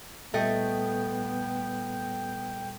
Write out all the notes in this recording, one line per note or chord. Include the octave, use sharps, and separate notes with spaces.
A#2 G3 A3 B3 A4 D#5 G5